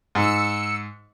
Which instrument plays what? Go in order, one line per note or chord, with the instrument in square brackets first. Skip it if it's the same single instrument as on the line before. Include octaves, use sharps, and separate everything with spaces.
[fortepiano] G#2 [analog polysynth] E6 C#7